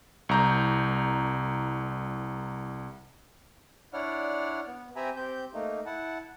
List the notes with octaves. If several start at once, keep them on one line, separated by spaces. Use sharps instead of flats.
C2 A#5 G6
D4 E4 C#5 D5 F#5 F6
B3
C4 G4 E5 G#5 A#5 B5
C4 G4 G6
A3 A#3 D#4
E4 F#5 A5